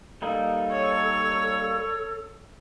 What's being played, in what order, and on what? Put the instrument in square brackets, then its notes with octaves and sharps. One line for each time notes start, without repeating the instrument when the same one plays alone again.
[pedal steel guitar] G3 A#3 D#4 [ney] A4
[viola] C#5